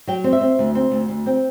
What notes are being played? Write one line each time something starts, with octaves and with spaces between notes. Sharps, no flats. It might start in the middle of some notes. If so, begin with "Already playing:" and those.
F#3 G5
C4
E5
C4
D2
C4
D2
D2
C4